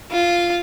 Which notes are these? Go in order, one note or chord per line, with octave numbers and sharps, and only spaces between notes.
F4